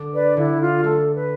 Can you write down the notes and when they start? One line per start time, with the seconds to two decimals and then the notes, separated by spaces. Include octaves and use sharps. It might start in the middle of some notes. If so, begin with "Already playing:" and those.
Already playing: D3 D4
0.14 B4 D5
0.37 D3 E4
0.60 F4
0.84 A3 A4
1.15 B4